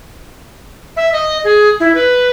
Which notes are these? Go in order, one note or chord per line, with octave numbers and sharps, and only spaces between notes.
E5
D#5
G#4
E4
B4